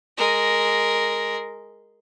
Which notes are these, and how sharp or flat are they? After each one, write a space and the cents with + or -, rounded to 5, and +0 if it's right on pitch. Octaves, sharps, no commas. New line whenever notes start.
G#3 +0 A#4 +0